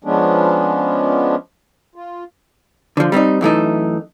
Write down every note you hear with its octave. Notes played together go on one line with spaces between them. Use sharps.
F3 G#3 B3 C#4 D4
F4
D3 F3
G3 C4 C#4 D#4
F#2 E3 A3 D#4